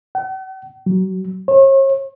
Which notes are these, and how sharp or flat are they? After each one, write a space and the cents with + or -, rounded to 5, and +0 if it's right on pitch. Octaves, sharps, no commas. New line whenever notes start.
F#5 +45
F#3 +30
C#5 -40